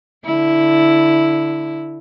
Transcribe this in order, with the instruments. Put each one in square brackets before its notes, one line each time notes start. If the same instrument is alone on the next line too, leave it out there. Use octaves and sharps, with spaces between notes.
[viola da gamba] D3 E4